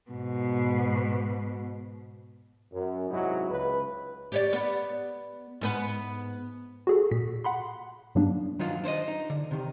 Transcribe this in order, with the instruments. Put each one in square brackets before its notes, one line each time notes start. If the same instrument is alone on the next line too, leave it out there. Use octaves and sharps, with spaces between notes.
[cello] G#2 B2
[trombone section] F#2
G#2 C3 F#3 C#4 D#4 E4
C#2 B4
[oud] G4 C#5 D5
B3 D5
G#2 B3 B4
[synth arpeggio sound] F#4 G#4 A4
A#2 B6
F#5 B5 C6
G2 F#3 G3 A#3 B3 D4
[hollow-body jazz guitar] D#3 F#3 D#4 F4
D4 C5 C#5 D#5
D#4
D3
C3 D#3